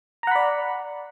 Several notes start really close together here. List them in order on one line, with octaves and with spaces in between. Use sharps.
A#5 F#5 B5 D5